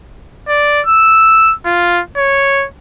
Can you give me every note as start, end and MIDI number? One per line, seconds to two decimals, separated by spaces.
0.48 0.81 74
0.86 1.53 88
1.65 2.01 65
2.17 2.66 73